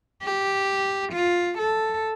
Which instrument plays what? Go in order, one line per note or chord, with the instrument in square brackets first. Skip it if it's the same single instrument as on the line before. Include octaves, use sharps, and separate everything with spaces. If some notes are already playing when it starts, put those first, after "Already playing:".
[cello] G4
F4
A4